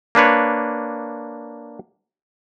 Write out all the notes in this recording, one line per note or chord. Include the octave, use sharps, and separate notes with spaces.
A#3 D4 B4 C#5